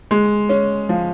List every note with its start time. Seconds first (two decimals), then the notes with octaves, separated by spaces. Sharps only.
0.11 G#3
0.49 C#4
0.89 F3